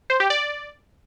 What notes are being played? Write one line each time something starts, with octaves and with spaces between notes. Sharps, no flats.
C5
G4
D5